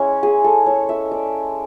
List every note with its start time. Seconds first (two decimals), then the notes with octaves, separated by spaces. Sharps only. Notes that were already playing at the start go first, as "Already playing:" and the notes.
Already playing: G#3 C#4 E4 C#5
0.23 G#4
0.44 A4
0.66 C#5
0.89 E5
1.11 D5